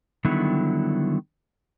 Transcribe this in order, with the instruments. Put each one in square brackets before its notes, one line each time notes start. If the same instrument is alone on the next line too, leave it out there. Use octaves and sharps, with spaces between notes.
[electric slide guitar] D3 D#3 F#3 G3 B3 E4